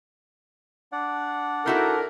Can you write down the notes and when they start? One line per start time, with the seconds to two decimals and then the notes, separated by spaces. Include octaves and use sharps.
0.92 D4 D5 F#5
1.66 D#4 E4 F#4 A4 A#4